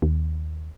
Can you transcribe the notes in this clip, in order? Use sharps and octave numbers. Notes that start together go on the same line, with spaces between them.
D#2